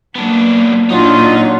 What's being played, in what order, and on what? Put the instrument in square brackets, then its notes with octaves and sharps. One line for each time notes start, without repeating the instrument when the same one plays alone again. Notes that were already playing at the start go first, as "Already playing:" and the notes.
[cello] F#3 A#3 [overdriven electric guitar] B3 D4
[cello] A#2 D4 [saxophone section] F#3 [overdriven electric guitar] D#4 [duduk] F4